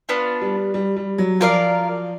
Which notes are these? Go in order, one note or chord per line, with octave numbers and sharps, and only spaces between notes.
B3 D4 F4
G3
G3
G3
F#3
F3 F4 A#4 D5 F5